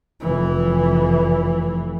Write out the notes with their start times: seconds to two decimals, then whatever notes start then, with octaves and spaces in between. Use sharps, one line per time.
0.20 F1 E3